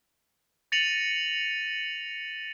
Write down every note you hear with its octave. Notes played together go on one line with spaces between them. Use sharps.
A6 A#6 C#7 D#7 F7 F#7